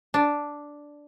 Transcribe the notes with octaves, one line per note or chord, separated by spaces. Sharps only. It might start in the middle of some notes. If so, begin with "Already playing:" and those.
D4